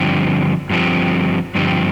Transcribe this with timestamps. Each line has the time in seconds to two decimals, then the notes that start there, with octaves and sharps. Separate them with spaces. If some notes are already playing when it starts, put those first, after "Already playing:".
Already playing: G2 D3 F3 C4 G4
0.70 G2 D3 F3 C4 G4
1.55 G2 D3 F3 C4 G4